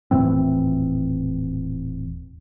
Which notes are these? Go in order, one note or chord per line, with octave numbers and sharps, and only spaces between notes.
D#1 A2 E3 C4